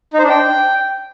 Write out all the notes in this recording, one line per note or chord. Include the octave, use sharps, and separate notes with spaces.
D#4
C5
D4
G5